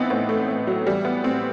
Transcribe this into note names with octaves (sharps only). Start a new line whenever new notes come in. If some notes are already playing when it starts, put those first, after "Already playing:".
Already playing: A2 E3 B3 C4 D#4 E4
A2 B3
A3
A2
F#3
E3 G3
B3
A2 C4